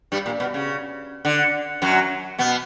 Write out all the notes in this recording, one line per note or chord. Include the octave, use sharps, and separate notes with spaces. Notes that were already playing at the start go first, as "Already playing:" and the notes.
G2 G3
A#2
B2
C#3
D3
F#2 F#3
B2 B3